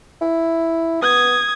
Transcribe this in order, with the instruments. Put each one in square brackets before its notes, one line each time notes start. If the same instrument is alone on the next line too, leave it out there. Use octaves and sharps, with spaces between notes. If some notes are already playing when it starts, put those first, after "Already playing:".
[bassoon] E4
[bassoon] B3 [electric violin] D#6 G#6